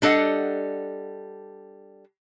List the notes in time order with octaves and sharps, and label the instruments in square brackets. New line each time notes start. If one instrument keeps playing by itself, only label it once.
[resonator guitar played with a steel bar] G3 D4 A4 D#5 F#5